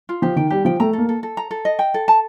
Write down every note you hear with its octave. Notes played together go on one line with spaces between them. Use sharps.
F4
F3 G4
D#3 G5
G3 G4
F3 G5
A3 A#5
A#3 A4
A4
A4
A#5
A4
D#5
G5
A4
A5